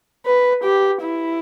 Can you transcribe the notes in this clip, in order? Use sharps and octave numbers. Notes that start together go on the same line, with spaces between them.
B4
G4
E4